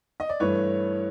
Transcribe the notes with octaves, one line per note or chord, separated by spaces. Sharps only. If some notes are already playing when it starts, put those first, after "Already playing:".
D#5
D5
G2 E3 A3 B4 C#5